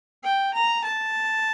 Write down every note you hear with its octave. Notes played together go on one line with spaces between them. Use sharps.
G5
A#5
A5